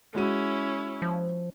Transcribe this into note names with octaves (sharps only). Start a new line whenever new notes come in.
G#3 C#4 E4 F#4 D#7
F3